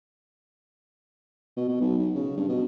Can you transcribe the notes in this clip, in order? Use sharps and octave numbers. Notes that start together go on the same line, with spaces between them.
B2
B2
B1
B1
C#3
G2
B2